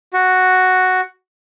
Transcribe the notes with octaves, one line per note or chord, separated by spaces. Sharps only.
F#4